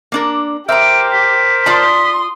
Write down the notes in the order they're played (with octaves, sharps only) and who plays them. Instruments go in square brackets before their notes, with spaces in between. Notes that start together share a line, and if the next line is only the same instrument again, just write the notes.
[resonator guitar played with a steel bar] A#3 D4 A#4
[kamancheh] G4 [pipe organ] A#4 C5 D6 [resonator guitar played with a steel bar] E5 A#5 [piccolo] D7
[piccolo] B6
[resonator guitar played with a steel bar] F4 D5 A5 [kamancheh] C6 D#6